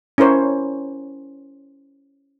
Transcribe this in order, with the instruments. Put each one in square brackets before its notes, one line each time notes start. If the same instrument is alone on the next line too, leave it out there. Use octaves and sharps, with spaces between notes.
[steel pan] C#4 E4 A#4 C5 C#5